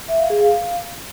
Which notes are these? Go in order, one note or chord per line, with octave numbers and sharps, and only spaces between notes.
E5
F5
G#4
F5